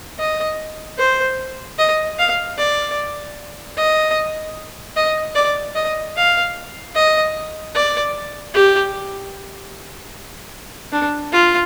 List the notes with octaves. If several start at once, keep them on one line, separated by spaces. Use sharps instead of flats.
D#5
C5
D#5
F5
D5
D#5
D#5
D5
D#5
F5
D#5
D5
G4
D4
F4